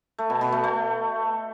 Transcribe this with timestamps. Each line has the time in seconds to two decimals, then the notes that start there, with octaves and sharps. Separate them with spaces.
0.19 A3
0.30 B2
0.41 B2
0.52 A3
0.64 A3